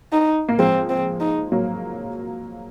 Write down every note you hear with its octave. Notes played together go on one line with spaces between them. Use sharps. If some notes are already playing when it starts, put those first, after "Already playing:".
D#4
A#3
F3 G#3 C4
C4
D#4
F#3 A#3